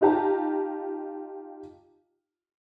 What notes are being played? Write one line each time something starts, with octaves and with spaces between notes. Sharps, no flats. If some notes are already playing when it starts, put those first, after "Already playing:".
D#4 F4 G4 A5 A#5